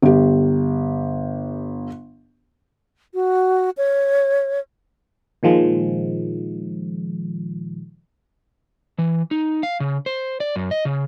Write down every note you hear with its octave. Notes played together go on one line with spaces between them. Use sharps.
G1 G4
F#4
C#5
A#2 D#3 F3 G#3
E3
D#4
F5
C#3
C5
D5
F#2
D#5
C#3